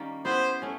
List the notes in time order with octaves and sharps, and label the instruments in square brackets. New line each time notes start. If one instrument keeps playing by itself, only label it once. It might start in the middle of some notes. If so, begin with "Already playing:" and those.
Already playing: [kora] D#3 G3 A#3 C#4
[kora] B3 E4 G4 B4 [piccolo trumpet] C5
[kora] A3 C#4